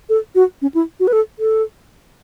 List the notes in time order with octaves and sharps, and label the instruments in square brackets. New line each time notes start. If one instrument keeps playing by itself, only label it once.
[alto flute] A4
F#4
C#4
E4
F#4
B4
A4
A4